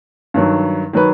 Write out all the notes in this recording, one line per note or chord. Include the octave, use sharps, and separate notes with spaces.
G2 D#3 F#3
D#3 F#3 B4